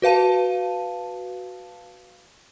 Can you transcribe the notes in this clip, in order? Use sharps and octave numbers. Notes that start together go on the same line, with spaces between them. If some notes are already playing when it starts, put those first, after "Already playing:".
F#4 B4 F5 A5 D#7